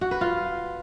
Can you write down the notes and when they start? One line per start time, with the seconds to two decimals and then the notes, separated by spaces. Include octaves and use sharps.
0.01 F#4
0.11 B4
0.21 F4